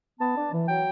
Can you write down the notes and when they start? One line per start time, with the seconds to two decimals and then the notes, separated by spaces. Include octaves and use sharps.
0.19 B3 A5
0.36 D4
0.52 E3
0.67 F#3 G5